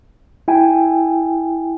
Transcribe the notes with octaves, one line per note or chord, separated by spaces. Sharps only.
E4 G5 G#5